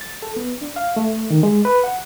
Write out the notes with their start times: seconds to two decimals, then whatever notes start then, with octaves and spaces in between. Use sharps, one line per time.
0.01 A6
0.23 A4
0.37 B3
0.61 D4
0.76 F5
0.96 A3
1.30 D#3
1.43 G#3
1.65 B4
1.84 F#5